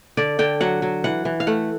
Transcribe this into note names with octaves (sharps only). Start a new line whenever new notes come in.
D3 D5
D3 G5
F#3 F#5
F#3
E3 F#5
E3
F5
A3 F#5